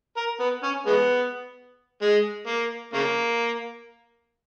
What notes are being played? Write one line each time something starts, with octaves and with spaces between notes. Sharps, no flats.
A#4
B3
C#4
G#3 B3
G#3
A#3
C#3 A#3